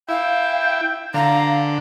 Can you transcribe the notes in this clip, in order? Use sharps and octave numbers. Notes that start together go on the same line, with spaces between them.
E4 F5 G5
D3 F5 A#5